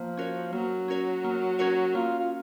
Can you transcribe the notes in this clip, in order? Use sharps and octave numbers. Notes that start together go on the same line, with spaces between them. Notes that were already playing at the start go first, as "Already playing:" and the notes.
Already playing: F3 A#3
C#4 F#4 A#4 C#5
F#3 A#3
C#4 F#4 A#4 C#5
A#3
C#4 F#4 A#4 C#5
A#3 F4
F4